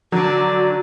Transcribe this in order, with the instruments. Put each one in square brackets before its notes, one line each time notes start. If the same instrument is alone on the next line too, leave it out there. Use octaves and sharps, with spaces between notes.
[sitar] D3 D4 [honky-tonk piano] F#3 [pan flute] F#4